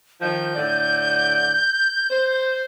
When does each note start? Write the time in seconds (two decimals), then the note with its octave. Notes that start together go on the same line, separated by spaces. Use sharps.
0.21 D#3 F3 G6
0.55 A2 D3 D5
2.10 C5